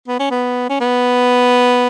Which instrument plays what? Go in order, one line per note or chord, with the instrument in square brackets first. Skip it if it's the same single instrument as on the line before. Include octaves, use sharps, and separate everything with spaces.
[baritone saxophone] B3
C#4
B3
C#4
B3